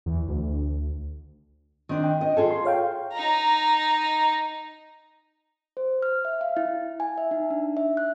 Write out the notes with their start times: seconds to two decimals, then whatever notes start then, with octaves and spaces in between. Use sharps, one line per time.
0.06 E2
0.28 D2
1.89 D#3 C4 D4
2.04 G5
2.20 B3 D#5
2.37 F4 G#4 A4
2.51 C6
2.65 C#5 F5 G5
3.13 D#4 A#5
5.77 C5
6.02 F6
6.25 E5
6.41 F5
6.57 E4
7.00 G#5
7.18 E5
7.31 D#4
7.50 D4
7.77 E5
7.97 F#6